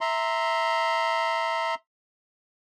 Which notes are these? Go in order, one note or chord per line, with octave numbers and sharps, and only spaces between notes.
E5 A#5 C6